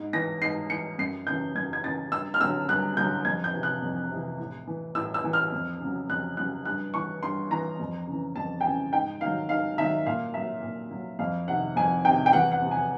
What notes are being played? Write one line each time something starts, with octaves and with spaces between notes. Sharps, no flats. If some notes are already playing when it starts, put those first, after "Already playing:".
Already playing: G#2
E3 A#6
G#2 C7
E3 C#7
F#2 C7
C#3 E3 G6
F#2 G#6
G#6
C#3 E3 A6
G2 E6
F6
D3 F#3 E6
G2 F#6
D3 F#3 G6
F2 G#6
G6
C3 E3
F#6
F2
C3 E3
A2
E3
A2 E6
E6
E3
F6
F2
C#3 F#3
F2 F#6
C#3 F#3 F#6
G2 F#6
E3 C#6
G2 C6
E3 A#5
F2
C#3 E3
F2 A5
G5
C#3 E3 G#5
G#2 G5
D#3 F#3 F5
G#2 F5
D#3 F#3 E5
A#2 F5
F#3 E5
A#2
F#3
F2 F5
C3 D#3 F#5
F2 G#5
C3 D#3 G5
G5
E2 F#5
F#5
C3 F3
G#5